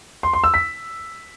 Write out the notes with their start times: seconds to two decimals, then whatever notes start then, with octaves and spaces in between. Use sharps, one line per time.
0.23 C6
0.33 C6
0.44 E6
0.54 B6